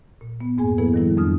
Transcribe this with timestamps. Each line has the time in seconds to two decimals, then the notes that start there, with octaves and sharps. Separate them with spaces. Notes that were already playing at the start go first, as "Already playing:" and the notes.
0.21 A#2
0.41 B3
0.58 F2 G#2 A#3 G#4 G#5
0.78 F3 A#3 B3 E4 A4 B4
0.94 D#3 G3 E4
1.18 F2 F#3 C4 D4 D#6 F6